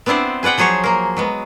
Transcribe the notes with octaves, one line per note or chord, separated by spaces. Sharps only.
B3 C4 D4 E4 C5 D5
G#4 B4 D5 F#5 G5
F3 F#3 G#4 C5 C#5
A#3 A#4
F#3 G#3 B3